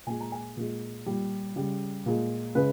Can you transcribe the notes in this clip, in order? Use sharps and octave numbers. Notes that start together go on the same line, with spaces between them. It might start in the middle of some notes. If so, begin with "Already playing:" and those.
A#2 G#3 G#5
A#5
G#5
A#2 G#3
A#2 G3
C#3 G3
A#2 G#3
C#3 G#3 B4